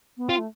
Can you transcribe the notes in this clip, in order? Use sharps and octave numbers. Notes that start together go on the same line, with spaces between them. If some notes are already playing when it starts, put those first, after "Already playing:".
B3
C4 F4
A3